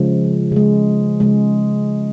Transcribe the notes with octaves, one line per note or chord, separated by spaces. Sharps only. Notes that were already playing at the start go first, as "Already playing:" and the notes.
Already playing: C#3 F3 G#3
C#3 G#3
C#3 G#3